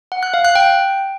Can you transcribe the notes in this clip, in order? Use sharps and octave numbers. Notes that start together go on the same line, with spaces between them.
F#5
F#6
F5
F#6
G5